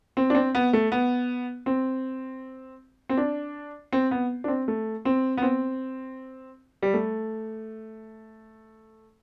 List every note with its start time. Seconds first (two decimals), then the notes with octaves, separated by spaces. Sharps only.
0.17 C4
0.30 D4
0.35 C4
0.55 B3
0.73 A3
0.92 B3
1.66 C4
3.09 C4
3.17 D4
3.93 C4
4.11 B3
4.44 D4
4.48 C4
4.68 A3
5.05 C4
5.38 B3
5.42 C4
6.82 G3
6.94 A3